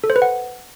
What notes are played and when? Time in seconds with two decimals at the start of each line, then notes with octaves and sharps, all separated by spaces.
0.04 A4
0.10 C5
0.16 B4
0.22 F#5